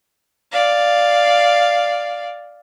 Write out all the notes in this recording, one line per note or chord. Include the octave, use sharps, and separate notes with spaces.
D5 F5